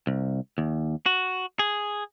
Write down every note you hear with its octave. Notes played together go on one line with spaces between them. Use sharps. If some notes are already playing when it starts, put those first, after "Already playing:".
C2
D#2
F#4
G#4